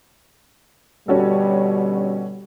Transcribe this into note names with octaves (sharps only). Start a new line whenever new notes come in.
B2 D3 G3 C#4 F#4 A4